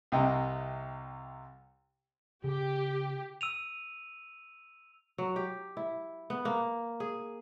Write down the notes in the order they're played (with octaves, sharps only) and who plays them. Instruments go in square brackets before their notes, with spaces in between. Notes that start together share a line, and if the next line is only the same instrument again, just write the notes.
[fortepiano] C2 C3 D#5 G5
[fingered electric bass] C#3 [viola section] G4
[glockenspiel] E6 D#7 F7
[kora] F#3
G4
E4
B3
A#3
G#4